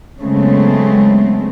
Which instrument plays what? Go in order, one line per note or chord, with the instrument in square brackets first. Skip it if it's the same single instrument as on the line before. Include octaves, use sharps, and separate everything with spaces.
[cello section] C#3 F#3 G#3 A3 B3 C4